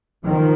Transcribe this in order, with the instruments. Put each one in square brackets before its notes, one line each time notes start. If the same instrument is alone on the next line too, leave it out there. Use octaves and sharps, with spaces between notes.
[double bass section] D#3 F3